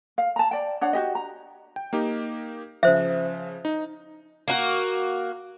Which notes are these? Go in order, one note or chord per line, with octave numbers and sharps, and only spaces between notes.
F5
A5 A#5
D5 G5
D4 C#5 F#5
F#4 G4 D#5
A#5
G5
A#3 D#4 G4
C#3 F3 C5 E5
D#4
A#3 F#4